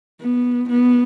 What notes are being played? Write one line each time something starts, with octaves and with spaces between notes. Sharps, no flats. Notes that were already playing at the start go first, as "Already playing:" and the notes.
B3
B3